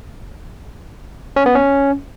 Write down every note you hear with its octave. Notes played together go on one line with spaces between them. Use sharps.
C#4
B3
C#4